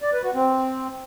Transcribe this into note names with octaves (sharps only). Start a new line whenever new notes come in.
D5
B4
F#4
C4